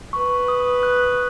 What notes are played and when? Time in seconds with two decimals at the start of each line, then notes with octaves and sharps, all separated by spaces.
0.13 B4 C#6
0.48 D#6
0.83 F#6